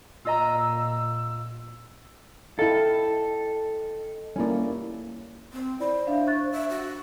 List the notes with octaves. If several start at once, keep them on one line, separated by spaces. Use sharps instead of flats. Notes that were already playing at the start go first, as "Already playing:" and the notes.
A#2 F4 D#5 A#5 E6
E4 A4 D#5 F5 G5 A5
G3 A#3 C#4 E4 D5
C4
E4 C5 D5 B5
D4 C#5 E5 F5
C#6 F#6 A6
E5
F#4